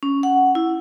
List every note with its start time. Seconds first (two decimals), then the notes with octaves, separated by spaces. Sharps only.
0.03 C#4
0.23 F#5
0.55 E4